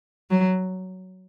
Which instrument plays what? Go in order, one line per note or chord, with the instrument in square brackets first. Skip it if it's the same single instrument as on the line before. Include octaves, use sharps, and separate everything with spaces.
[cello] F#3